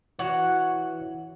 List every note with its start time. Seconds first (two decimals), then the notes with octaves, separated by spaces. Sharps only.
0.19 E3 F#4 C#5 F#5